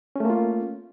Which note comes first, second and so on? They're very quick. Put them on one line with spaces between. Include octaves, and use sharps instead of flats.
C#4 A3 A#3 F4